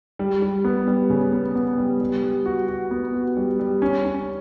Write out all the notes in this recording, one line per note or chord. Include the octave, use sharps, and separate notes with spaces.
G3
G3
B3
G3
C#3
B3
B3
G3
G3
G3
F#4
F#4
B3
F#4
G3
G3
C#4
C#4